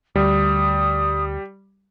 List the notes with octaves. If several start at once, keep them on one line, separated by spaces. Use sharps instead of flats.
D2 G3 D#6